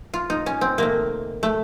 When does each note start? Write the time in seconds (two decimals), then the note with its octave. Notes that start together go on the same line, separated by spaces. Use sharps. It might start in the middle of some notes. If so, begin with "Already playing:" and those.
0.14 F4
0.30 D#4
0.46 C#4
0.61 C4
0.78 C3 D#3 A3 A#3
1.43 A3